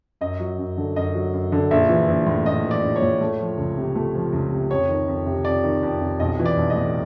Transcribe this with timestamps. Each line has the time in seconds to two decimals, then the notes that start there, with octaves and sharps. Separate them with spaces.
0.21 F#2 D#5
0.40 F#3
0.59 F#2
0.77 D3
0.96 F#2 D#5
1.14 F#3
1.33 F#2
1.52 D3
1.71 A#1 E5
1.89 E3
2.08 A#1
2.27 A2
2.46 A#1 D#5
2.64 E3
2.71 D5
2.83 A#1
2.96 C#5
3.02 A2
3.21 A3
3.39 F3
3.58 C#2
3.77 C3
3.95 A3
4.15 F3
4.33 C#2
4.52 C3
4.70 F2 C#5
4.89 D#3
5.08 F2
5.26 C3
5.45 F2 D5
5.64 D#3
5.83 F2
6.01 C3
6.20 B1 D#5
6.39 E3
6.46 D5
6.57 B1
6.70 D#5
6.76 A2